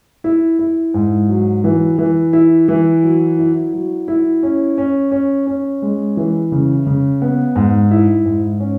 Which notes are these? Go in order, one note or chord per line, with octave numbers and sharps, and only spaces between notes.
E4
E4
G#2
F#3
E3
E3
E4
E3
F#3
E4
F#3
E4
C#4
C#4
C#4
C#4
G#3
E3
C#3
C#3
B3
G#2
E4
G#2
C#4